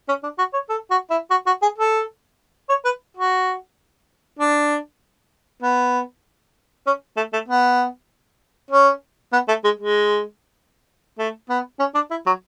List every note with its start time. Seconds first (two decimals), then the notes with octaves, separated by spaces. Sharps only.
0.08 C#4
0.23 D4
0.38 F#4
0.53 C#5
0.69 A4
0.90 F#4
1.10 E4
1.30 F#4
1.46 F#4
1.62 G#4
1.78 A4
2.69 C#5
2.85 B4
3.17 F#4
4.39 D4
5.62 B3
6.87 C#4
7.17 A3
7.33 A3
7.48 B3
8.71 C#4
9.33 B3
9.48 A3
9.64 G#3
9.79 G#3
11.18 A3
11.49 B3
11.79 C#4
11.94 D4
12.10 E4
12.26 F#3